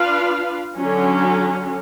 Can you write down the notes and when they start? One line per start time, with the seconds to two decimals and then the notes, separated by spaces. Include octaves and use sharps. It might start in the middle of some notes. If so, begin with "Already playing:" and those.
Already playing: D4 F4 B4 F5
0.78 D3 F#3 C#4